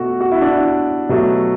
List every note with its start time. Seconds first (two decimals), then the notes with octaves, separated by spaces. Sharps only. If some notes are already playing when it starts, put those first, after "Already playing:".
Already playing: B2 A3 F#4 A4
0.21 F#4
0.32 E4
0.41 D4
0.51 E4
1.09 B2 F#3 A3